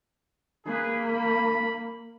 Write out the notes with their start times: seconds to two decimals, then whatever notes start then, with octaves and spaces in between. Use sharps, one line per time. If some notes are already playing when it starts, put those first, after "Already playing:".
0.67 A#3 G#4 B4
1.07 B5